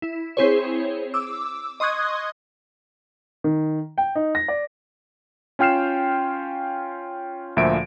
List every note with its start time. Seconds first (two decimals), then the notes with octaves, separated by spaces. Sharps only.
0.02 E4
0.37 C4 E4 G#4 C5 C#5
1.14 D6 E6
1.80 D#5 C6 C#6 D#6 F#6 G#6
3.44 D#3
3.98 G5
4.15 D#4
4.35 A#6
4.48 D5
5.59 C#4 F4 G5 F6 C7 E7
7.57 D2 A#2 F3 E5 D7